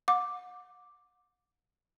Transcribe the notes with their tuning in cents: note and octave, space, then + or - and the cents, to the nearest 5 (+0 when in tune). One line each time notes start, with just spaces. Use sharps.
F#5 -35 D6 +0